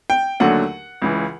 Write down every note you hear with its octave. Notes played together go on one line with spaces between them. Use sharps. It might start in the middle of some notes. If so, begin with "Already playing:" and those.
G5
D#2 D3 F#3 A3 F#5
C#2 C#3 E3